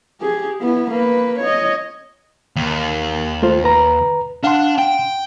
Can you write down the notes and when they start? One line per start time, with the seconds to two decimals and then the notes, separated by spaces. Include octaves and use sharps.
0.21 G4 G#4
0.62 B3 E4
0.91 A#3 B4
1.40 C#5 D#5
2.56 D#2
3.43 A3 F4 C5
3.64 B4 A#5
4.44 D4 F5 F#5 C6
4.79 G5